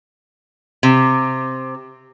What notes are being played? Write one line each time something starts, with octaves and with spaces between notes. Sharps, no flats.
C3